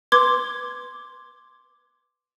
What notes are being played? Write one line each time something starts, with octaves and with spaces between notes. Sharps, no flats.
B4 C6 D6 G#6